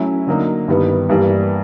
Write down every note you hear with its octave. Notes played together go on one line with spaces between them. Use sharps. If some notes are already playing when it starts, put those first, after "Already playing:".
Already playing: F#3 A3 C#4 E4
D3 F#3 A#3 D#4
G2 D#3 G3 B3 E4
G2 E3 G3 A#3 D4